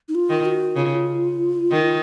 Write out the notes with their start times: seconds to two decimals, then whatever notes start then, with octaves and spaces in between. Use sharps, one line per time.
0.08 D#4
0.15 F4
0.30 D#3
0.45 F#4
0.76 C#3 F4
1.71 D#3